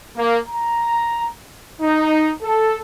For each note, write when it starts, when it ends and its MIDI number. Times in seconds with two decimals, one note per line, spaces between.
0.16 0.38 58
0.49 1.28 82
1.81 2.32 63
2.43 2.80 69